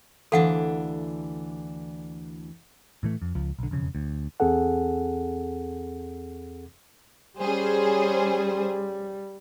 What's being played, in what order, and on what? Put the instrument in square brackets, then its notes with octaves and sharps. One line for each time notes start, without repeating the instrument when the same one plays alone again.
[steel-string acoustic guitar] D2 E3 D4 [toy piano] A4 F5 F#5
[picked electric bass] A2 E3 A3
F2
C#2 F3
B1 D3
E1 F2 C#3
D2
[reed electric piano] E2 C4 G#4 A4 F#5
[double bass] G3 [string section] C#4 G#4 C5